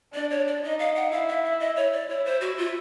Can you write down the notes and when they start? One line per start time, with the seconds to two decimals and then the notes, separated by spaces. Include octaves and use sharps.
0.14 D4 D5
0.31 C#5
0.48 D5
0.64 D#4 D#5
0.79 F5
0.96 F#5
1.12 E4 F5
1.28 E5
1.44 E5
1.60 D#5
1.76 C#5
1.93 D5
2.09 E4 C#5
2.26 C5
2.41 F#4
2.58 F4